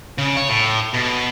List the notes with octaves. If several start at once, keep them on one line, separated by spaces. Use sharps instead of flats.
C#3
C#5
A2
B2